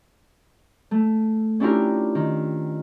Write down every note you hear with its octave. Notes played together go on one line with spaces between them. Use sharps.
A3
C#4 D4 E4 F4 G4 A#4
D#3